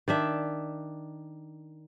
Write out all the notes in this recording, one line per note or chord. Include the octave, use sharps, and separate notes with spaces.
D#3 D4 E5